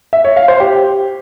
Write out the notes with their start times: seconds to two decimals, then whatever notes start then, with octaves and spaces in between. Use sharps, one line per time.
0.13 E5
0.25 C#5
0.36 F5
0.48 C5
0.60 G4